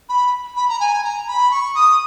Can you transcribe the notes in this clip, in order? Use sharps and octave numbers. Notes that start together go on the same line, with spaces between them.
B5
B5
A#5
G#5
A#5
B5
C#6
D#6